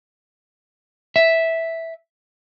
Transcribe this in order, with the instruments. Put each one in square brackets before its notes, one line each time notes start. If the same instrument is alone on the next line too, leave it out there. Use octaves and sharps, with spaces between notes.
[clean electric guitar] E5